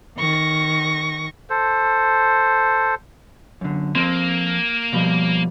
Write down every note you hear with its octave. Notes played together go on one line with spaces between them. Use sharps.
D#3 C#6 A#6
A4 C5
F#2 D3
F2 A#3 C4 C6
B2 F3 G3